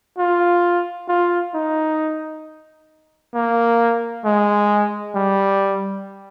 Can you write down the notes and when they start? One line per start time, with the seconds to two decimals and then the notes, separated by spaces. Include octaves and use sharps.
0.18 F4
1.08 F4
1.54 D#4
3.34 A#3
4.25 G#3
5.15 G3